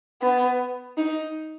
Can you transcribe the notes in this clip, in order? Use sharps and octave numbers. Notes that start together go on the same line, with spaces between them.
B3
D#4